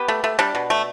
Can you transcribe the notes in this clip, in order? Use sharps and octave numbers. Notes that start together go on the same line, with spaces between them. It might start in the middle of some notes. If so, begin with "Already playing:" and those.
Already playing: B3 G4
A3
A3
G3 D4
B2
A3